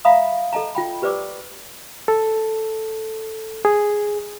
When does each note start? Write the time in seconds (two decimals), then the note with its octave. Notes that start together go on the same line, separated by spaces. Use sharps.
0.05 E5 F5 A#5 B5 D#6
0.53 A4 D#5 A5 A#5
0.75 F4 G5 B5
1.02 G4 B4 C5 D5 D6 E6
2.08 A4
3.65 G#4